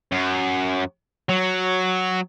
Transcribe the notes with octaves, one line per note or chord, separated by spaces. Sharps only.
F#2
F#3